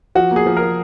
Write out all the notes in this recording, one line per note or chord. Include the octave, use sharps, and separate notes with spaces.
F3 F#4
A#3
G#4
F3
A#4
F3